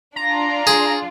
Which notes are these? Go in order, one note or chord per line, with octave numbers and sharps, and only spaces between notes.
D4 F4 A#5
G#4